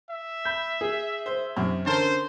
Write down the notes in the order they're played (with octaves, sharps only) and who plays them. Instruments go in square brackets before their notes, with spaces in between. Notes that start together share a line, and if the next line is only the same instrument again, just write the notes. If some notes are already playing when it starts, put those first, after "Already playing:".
[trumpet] E5
[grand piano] B5 G6
G#4
[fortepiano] C5
F#2 C3
[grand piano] D3 C#4 [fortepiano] A#4 A5 [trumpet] C5